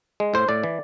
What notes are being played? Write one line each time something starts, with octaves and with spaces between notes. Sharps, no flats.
G#3
A2 C5
A2 D5
E3